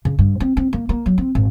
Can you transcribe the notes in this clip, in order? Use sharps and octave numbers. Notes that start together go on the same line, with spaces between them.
C#3
G2
C4
C4
A#3
A#3
F#3
C4
G#1